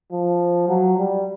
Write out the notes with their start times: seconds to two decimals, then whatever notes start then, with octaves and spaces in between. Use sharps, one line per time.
0.12 F3
0.69 F#3
0.98 G3